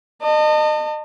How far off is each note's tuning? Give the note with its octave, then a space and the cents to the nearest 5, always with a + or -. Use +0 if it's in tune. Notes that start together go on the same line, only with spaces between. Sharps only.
D#5 -30 A5 +35